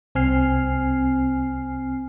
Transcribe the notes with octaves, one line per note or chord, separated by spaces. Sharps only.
C2 C4 G#5 F6 C7